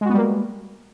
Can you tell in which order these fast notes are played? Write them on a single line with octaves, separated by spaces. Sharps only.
G#3 F#4 B3 G3 A#3